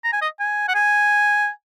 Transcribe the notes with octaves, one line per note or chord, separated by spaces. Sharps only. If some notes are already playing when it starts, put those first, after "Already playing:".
A#5
G#5
D#5
G#5
F#5
G#5